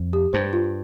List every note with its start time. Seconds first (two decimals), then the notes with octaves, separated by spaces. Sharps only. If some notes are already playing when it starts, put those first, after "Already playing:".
Already playing: F2
0.13 G4
0.33 G2 C5
0.53 F4